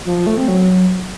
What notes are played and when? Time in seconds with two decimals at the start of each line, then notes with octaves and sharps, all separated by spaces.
0.05 F3
0.16 F3
0.26 A3
0.37 C4
0.48 F#3